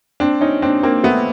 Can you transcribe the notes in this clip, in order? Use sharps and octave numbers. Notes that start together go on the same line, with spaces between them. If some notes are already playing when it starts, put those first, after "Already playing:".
C4 D4
C#4 D#4
C4 D4
A#3 C4
A3 B3